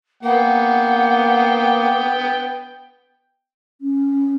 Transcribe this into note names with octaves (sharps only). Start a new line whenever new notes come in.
A#3 B3 F#5 G5
C#4